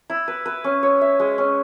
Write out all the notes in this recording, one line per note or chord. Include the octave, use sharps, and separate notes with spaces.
E4
B4
B4
C#4
C#5
E5
G#3
C#4